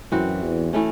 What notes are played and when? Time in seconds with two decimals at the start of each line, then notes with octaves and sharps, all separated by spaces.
0.12 F#2 E3 C4 F#4
0.42 E2
0.73 E3 A3 C#4